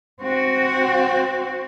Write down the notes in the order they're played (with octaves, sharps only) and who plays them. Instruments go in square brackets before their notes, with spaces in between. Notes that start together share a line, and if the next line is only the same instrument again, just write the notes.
[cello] C4 F#4